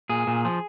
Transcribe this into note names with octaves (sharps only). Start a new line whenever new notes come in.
A#2 G#4
A#2
F3